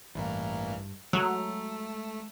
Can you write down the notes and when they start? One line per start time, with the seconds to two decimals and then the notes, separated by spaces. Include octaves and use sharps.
0.15 A1 G2 E3 A#3
1.13 F#3 G#3 A3 A#5 E6